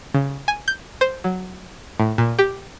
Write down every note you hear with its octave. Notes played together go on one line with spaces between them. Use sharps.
C#3
G#5
G6
C5
F#3
A2
A#2
G4